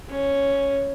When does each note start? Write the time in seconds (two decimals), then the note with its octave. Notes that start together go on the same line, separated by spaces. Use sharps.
0.10 C#4